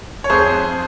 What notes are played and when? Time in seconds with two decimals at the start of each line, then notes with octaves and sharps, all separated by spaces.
0.24 C#5
0.30 F2 G#4 C5
0.52 F2